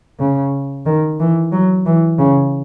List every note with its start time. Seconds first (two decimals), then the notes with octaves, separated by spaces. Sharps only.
0.19 C#3
0.85 D#3
1.20 E3
1.52 F#3
1.86 E3
2.19 C#3